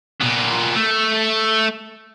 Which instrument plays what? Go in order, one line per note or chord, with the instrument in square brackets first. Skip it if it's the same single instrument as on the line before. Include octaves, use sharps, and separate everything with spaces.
[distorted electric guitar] A#2 B3
A3